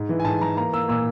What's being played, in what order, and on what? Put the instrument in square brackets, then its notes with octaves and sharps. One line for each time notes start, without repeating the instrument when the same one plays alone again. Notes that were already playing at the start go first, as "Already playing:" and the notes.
Already playing: [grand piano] G#2
E3
G#5
G#2 A5
E3 A#5
A#3 A#5
A#3 E6
A#2 E6